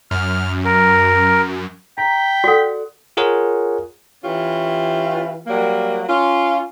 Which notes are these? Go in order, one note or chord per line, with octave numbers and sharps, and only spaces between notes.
F#2 F6
A#4
G5 A#5 B6
F#4 A4 D5 F#5
F4 G#4 A#4 C#5 F#5
E3 C#4 F4 G4
F#3 G3 A#3
C#4 F4